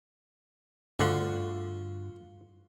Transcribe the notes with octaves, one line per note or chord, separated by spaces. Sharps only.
D2 G2 D3 F4 F#4 F#5